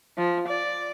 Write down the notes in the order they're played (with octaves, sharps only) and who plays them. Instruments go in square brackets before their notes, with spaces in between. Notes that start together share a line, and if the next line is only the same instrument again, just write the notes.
[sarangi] F3
D5